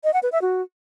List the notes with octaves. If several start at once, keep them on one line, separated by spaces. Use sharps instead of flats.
D#5
F#5
B4
E5
F#4